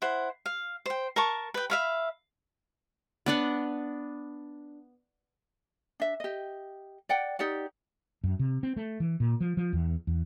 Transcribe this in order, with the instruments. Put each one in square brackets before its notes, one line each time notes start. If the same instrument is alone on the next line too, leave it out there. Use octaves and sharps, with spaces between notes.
[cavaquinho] E4 C5 F#5
F5
C5 G5
A#4 A5 C#6
B4 G5
E5 F5 B5
[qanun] B3 D4 F#5
[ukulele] D4 E5
G4 D#5
D5 F#5 G5
D#4 G4 D5 F#5
[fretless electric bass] F#2
C3
C4
A3
E3
A#2
F3
F3
E2
E2